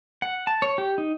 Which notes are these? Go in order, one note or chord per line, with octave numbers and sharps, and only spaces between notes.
F#5
A5
C#5
G4
D#4